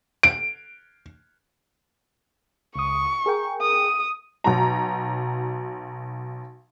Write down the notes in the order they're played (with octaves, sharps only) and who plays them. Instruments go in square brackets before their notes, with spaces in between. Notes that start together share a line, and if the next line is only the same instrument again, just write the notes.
[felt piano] D7
[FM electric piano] C#2 D#6 [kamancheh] C#6
[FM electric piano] G#4 A#4 G5
[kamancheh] D#6
[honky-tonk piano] B1 F#3 A#5